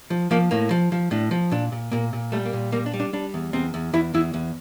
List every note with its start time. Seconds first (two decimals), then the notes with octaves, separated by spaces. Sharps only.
0.10 F3
0.31 F3 A#3
0.51 A2 A#3
0.71 F3
0.92 F3
1.11 A2 D4
1.31 F3
1.51 A#2 D4
1.72 A#2
1.92 A#2 A#3
2.13 A#2
2.32 G3 A3
2.46 A#3
2.53 A#2
2.72 G3 A#3
2.86 D4
2.94 G3
3.00 D4
3.13 G3 D4
3.34 E2
3.53 E2 C4
3.74 E2
3.93 E2 E4
4.14 E2 E4
4.34 E2